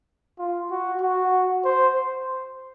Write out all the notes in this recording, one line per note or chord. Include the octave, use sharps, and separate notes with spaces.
F4
F#4
F#4
C5